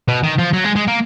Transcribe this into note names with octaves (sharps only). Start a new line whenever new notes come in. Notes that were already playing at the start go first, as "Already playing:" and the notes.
B2
D#3
F3
F#3
G#3
G#3
A#3